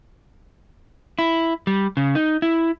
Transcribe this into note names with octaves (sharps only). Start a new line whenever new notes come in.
E4
G3
C#3
D#4
E4